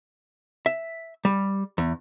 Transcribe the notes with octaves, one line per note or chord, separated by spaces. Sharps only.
E5
G3
E2